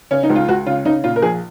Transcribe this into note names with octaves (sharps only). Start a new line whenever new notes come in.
C#3 C#4
D#4
C#2
F4
C#2 F#4
C#3 F4
C#3 D#4
A#2 F4
A#4
A#1 G#4